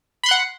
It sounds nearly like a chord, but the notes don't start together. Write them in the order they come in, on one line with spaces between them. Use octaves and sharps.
B5 C6 F#6 F#5